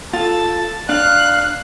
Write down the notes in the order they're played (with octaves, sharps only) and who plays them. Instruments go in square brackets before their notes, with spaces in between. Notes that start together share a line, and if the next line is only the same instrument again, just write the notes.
[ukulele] F4 [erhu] A4 [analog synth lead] A6
[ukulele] D4 [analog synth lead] F5 [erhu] F#6